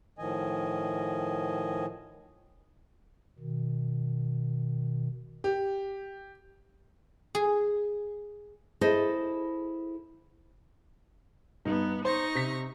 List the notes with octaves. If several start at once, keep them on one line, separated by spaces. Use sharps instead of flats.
A2 D#3 F3 D#5 G#5
B2 D#3
G4
G#4
E4 G#4 A4 C5 D#5
G2 B3 D#4
D#4 C5 C#6 A#6
C3 B6